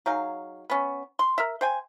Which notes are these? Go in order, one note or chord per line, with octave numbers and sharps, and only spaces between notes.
F#3 D#4 G#4 F5
B3 C#4
C6
A#4 E5
C5 G5 G#5